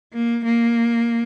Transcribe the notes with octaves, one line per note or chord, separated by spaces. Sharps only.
A#3
A#3